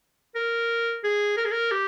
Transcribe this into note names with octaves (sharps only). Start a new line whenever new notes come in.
A#4
G#4
A#4
G#4
A#4
G4